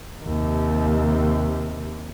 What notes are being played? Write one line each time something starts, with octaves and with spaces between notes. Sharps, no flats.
D#2 C3